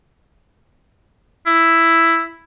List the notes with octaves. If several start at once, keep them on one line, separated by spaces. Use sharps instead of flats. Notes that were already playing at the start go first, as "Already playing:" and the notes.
E4